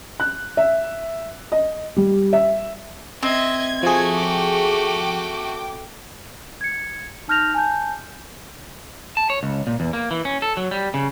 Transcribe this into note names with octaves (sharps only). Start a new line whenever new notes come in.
F#6
E5
D#5
G3
E5
C4 D#5 E5 G#6
F3 A3 F#4 G#4
G5 D6
G#6 C#7
D#4 A5 F6 G6 A#6 F7
G#5 A5 G6
A5
C#5
C#2
A#2
E2
A#3
E3
C#4
A4
F#3
G3
C#3